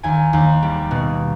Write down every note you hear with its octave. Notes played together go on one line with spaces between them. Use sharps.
D#2 G#5
D#2
G3
B2